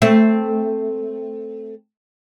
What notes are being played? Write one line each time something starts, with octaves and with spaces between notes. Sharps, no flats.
A3 C4